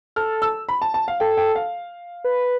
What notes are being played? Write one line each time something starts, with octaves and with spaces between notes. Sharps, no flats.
A4 F6
E6
B5
A5
A5
F5
A4 G5
G5
F5
B4